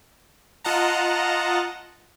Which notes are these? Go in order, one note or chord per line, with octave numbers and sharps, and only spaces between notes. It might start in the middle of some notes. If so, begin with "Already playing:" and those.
F4 D#5 F#5 A5 A#5